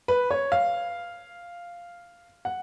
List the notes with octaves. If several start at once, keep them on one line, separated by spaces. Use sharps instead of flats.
B4
C#5
F5
F#5